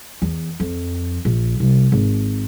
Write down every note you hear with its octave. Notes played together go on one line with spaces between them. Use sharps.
E2
F2
A#1
C2
G#1